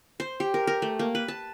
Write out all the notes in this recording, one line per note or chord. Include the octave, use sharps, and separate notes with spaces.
C5
G4
A#4
A#4
A3
A#3
B4
A5